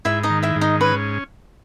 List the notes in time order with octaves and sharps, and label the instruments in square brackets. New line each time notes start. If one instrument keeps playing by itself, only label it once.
[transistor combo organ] G#2 [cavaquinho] E4 E5
[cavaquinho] D#4 D#5
[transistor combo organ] D#3
[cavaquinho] E4 E5
[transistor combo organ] G#2
[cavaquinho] D#4 D#5
[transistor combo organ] C#4 [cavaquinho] B4